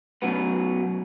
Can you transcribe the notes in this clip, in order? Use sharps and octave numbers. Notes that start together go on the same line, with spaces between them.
F#2 B2 B3